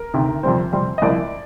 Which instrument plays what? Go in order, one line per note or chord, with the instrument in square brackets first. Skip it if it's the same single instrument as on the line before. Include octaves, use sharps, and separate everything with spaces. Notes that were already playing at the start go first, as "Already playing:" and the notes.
Already playing: [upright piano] A#4
D2 C3 D#3
F2 C3 G3 C4 C5
F2 C3 G3 C4
D#5
C2 A#2 F3 A#3 D5